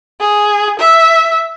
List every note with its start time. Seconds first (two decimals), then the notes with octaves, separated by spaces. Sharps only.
0.20 G#4
0.79 E5